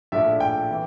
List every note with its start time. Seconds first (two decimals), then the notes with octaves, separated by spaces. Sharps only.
0.12 A#1 A2 F3 A3 D4 E5
0.40 G5
0.71 E3